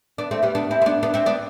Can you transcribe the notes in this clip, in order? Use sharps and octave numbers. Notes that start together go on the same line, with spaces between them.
B3 D4
A3 C4
G3 B3
B3 D4
C4 E4
C4
B3 D4
B3 D4
C4 E4
B3 D4